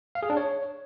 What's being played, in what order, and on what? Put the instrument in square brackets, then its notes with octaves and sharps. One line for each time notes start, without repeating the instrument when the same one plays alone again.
[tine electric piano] F5
G#4
D4
C#5